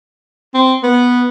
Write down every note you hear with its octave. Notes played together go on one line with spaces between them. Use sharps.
C4
B3